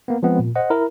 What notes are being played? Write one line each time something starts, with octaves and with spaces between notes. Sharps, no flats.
A#3 B3
F3 G#3 B3 C4
A#2
C5 D#5 F#5
E4 A#4